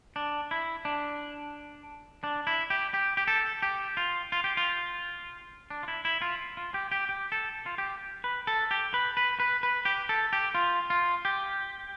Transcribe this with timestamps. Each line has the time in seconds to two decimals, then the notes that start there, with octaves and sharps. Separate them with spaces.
0.16 D4
0.51 E4
0.85 D4
2.24 D4
2.47 E4
2.70 G4
2.94 G4
3.17 G4
3.28 A4
3.62 G4
3.97 F4
4.32 F4
4.44 G4
4.57 F4
5.70 D4
5.83 F4
5.88 E4
6.05 E4
6.22 F4
6.57 F4
6.74 G4
6.91 G4
7.09 G4
7.32 A4
7.66 F4
7.78 G4
8.24 B4
8.47 A4
8.71 G4
8.94 B4
9.17 B4
9.40 B4
9.63 B4
9.85 G4
10.09 A4
10.33 G4
10.55 F4
10.90 F4
11.25 G4